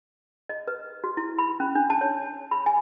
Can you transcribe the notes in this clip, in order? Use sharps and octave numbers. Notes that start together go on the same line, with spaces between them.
D#5
B4
F#4
E4
B5
C#4
D4
A5
C#5
B5
G#5